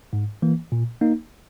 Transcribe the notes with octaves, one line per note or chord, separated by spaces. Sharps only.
G#2
E3 A#3
A#2
A#3 D#4